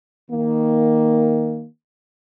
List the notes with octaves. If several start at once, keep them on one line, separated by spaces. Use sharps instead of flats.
D#3 A#3